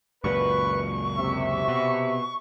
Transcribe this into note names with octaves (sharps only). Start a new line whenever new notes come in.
C#2 F#2 A#2 B4 C#6
C3 E5
B2